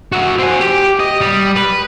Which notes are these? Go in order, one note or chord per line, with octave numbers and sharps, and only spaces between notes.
F#4 E5
C4 G#5
G4
D#5
G3
B4